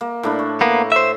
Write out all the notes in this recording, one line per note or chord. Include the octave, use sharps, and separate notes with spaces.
A#3
A2 D4 E4
C#5
A#3 B3
C5 E5